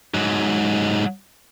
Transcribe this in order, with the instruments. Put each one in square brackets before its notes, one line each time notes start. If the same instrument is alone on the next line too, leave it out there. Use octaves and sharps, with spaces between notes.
[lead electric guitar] G#2 F#3